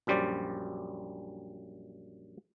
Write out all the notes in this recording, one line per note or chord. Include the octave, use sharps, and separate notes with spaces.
A#1 F#2 G3 C5 D5